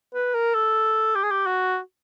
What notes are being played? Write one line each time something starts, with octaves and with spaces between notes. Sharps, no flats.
B4
A#4
A4
G4
G#4
G4
F#4